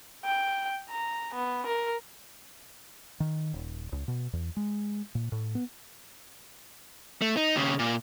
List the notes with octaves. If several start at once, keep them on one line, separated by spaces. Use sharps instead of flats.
G5
A#5
B3
A#4
D#3
D#1
C#2
B2
E2
G#3
A#2
A2
B3
A3
D#4
D#2 C#3
A#2